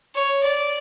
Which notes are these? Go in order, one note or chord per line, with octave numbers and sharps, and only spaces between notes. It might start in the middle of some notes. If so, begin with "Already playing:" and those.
C#5
D5